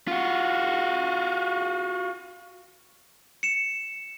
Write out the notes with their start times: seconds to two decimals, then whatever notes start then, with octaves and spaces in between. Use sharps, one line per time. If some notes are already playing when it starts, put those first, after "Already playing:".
0.08 F4 F#4
3.43 C#7 E7